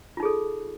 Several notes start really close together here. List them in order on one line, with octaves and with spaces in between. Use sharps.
F4 D#4 G#4 A4